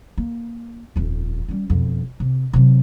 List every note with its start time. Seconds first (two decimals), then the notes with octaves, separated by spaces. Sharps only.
0.18 A#3
0.96 D#1 F2
1.48 G3 C#4
1.70 E1 F2
2.20 C3
2.53 C3 F#3